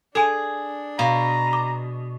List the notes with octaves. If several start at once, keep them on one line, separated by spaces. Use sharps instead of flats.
D4 G#4 A4 G#5 D#7
B2 F5 A#5
D6